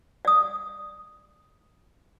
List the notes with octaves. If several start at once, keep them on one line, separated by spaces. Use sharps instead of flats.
D5 D#6